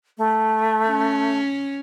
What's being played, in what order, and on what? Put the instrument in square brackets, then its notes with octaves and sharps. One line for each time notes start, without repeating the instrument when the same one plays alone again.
[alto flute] A3
[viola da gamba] C#4